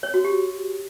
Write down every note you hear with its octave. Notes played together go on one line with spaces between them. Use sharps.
C#5
F#4
G4